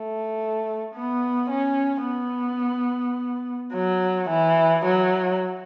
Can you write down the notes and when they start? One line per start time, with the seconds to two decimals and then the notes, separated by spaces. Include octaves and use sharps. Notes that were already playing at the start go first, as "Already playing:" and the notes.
Already playing: A3
0.95 B3
1.51 C#4
2.06 B3
3.74 F#3
4.30 E3
4.85 F#3